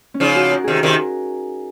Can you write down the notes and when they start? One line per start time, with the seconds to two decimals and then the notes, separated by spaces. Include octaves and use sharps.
0.14 C#4
0.20 C#3 F3 D#4
0.36 F#4
0.52 A#4
0.64 C3 D#3 G#4
0.77 A#4
0.83 C3 D#3